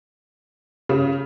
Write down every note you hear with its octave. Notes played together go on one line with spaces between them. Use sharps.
C#3